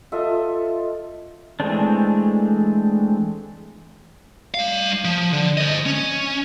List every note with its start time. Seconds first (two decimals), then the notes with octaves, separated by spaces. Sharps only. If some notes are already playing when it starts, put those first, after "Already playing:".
0.12 F4 A4 D#5 E5
1.60 E3 G#3 A3 C4 D4
4.54 G3 F5
5.05 F3
5.33 D3
5.57 C5 D#5
5.86 C#4